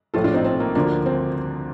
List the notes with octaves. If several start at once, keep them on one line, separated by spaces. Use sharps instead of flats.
A#1 A2 F3 F4 A4
D4 F4
C4 D#4
C4
A#3
D2 D3 F3 A#3 D4
C4